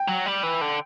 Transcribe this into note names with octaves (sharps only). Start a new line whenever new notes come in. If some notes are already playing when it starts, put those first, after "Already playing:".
Already playing: G5
F#3
G3
E3
D3